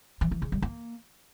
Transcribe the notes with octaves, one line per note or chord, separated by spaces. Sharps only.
E3
E3
C#3
G3
A#3